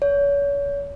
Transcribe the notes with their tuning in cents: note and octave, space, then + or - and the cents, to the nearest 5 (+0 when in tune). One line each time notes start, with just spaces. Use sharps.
C#5 +35